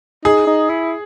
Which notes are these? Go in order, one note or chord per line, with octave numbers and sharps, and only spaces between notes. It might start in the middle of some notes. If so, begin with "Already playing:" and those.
D#4 G#4
D#4
E4